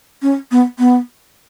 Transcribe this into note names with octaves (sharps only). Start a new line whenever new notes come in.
C#4
B3
B3